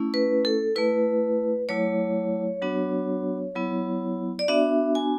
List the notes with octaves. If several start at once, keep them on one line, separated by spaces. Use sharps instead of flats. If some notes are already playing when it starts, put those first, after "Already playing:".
Already playing: A3 C#4 E4
B4
A4
A3 E4 B4
F#3 A3 E4 C#5
F#3 B3 D4 F#4
F#3 B3 E4
D5
B3 D4 F#4 E5
G#5